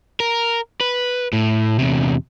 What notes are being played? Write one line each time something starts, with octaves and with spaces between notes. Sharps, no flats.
A#4
B4
A2
E2 C3